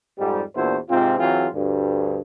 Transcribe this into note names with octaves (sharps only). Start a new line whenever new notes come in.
F2 G#2 G3
E2 A#2 D4 E4 F#4 C5
G#2 C3 C4 F4
E3 F#3 C4 F4 G#4
D2 G2